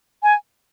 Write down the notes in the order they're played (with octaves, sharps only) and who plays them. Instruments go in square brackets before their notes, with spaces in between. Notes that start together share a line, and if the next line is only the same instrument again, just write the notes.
[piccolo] G#5